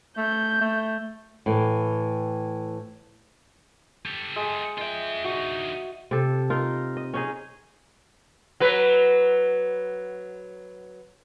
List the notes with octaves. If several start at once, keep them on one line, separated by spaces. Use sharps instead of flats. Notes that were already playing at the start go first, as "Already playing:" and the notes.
A3 G6
A3
A2 E3
G4 A4
G#3
F4 D#5 E5 G5
D2 D#4 F#4
C3 A4
D#4 F4 A#4
D#5
C#4 D#4 G#4
F#3 B4